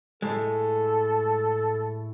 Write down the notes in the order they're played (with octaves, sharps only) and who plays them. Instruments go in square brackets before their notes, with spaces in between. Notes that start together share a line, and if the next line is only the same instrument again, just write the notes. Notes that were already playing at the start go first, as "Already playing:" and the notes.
[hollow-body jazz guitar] A2 G#3 [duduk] A4